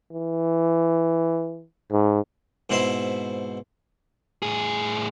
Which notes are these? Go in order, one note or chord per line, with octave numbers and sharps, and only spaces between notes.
E3
G#2
G#2 B2 C4 E4 C5 C6
A2 G#4